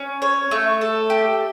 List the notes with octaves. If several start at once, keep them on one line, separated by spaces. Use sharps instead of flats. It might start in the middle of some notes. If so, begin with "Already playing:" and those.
Already playing: C#4
C#5
A3
A4
G4